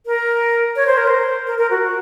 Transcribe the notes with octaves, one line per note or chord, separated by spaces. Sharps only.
A#4
C#5
C5
A#4
C5
A#4
A#4
F#4
F#4